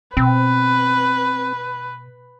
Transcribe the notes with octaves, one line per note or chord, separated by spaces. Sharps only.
B2 C4 B4